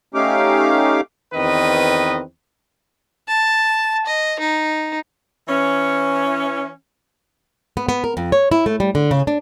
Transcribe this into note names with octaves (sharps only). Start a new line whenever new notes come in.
A3 C#4 D#4 G4 F5 D6
E2 D#3 C4 B4 D#5
A5
D#5
D#4
E3 C#4
B3
B3
A#4
F2
C#5
E4
A3
G3
D3
C#3
D4